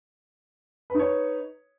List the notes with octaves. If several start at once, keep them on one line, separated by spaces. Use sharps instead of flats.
D#4 B4 C#5